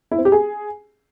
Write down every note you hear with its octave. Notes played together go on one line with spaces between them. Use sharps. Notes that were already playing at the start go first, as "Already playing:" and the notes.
E4
C4
G4
G#4